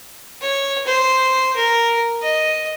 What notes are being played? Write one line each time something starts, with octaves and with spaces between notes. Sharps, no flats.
C#5
C5
A#4
D#5